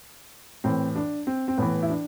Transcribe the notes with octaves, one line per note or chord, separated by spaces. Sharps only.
A2 E3 C4
D4
C4
C4
A2 E3 B3
E4
D4